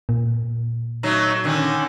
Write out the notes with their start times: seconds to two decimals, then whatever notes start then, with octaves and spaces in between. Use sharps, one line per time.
0.09 A#2
1.03 F#3 A3 D#4
1.44 D3 D#3 C#4